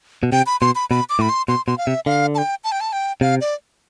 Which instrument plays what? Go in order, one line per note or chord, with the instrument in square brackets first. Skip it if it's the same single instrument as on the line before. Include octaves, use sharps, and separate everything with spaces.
[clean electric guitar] B2
[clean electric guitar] C3 [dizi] G5
[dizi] B5
[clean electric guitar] B2 [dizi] C6
[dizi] B5
[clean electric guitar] B2 [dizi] B5
[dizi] D6
[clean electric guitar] A2 [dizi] B5
[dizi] C6
[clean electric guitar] B2 [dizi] C6
[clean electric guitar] B2 [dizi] C6
[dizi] F5
[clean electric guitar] C3 [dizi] E5
[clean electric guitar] D3 [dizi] F5
[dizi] A5
G5
A5
G5
A5
G5
[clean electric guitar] C3 [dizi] F5
[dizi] D5